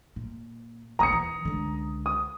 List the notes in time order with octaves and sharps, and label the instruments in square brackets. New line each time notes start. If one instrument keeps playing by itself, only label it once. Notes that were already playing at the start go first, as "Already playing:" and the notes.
[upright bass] A#2
[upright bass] A#1 D#2 [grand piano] A#5 D#6 C#7
[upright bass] E3
C#2 D3
[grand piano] D#6